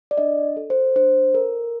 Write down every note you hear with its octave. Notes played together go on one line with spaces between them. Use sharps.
D5
D4 D#5
A4
C5
D4 C5
A4 A#4